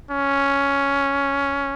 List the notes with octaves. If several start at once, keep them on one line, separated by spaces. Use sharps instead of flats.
C#4